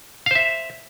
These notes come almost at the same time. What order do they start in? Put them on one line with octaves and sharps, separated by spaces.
F5 C5 E5